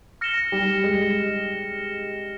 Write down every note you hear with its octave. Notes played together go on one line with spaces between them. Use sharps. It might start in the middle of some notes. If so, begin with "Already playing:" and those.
F6 A#6 C#7 E7 G7
G3
G#3